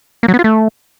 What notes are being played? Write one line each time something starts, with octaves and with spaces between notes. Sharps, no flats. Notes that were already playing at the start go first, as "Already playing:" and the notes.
A#3
F#3
B3
F4
A3